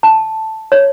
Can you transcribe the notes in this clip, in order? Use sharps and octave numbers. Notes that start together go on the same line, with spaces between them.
A5
C#5